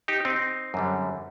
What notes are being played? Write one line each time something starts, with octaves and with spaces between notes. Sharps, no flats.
D#4 G4
C4 D#4
F#2 D3 G3